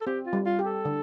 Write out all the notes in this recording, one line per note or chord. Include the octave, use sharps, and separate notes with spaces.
A4
C4 G4
F4
G3
F4
G4
A4
D3